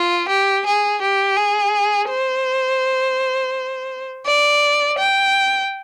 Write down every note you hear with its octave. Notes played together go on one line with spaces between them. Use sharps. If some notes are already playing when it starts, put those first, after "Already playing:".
Already playing: F4
G4
G#4
G4
G#4
C5
D5
G5